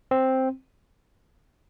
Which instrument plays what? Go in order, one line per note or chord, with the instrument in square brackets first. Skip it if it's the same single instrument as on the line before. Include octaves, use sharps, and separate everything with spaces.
[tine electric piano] C4